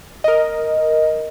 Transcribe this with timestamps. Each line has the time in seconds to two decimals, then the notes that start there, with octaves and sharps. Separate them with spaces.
0.24 A#4 D#5